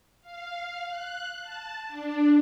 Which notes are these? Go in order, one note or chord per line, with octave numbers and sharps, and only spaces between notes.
F5
F#6
A5
D4